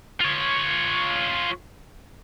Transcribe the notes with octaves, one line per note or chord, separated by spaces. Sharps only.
F4 C#5